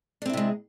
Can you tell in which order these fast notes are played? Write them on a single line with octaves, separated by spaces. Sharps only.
D4 C4 E4 C3 G#3